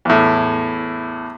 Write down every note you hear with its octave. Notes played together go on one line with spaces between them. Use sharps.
E2 A2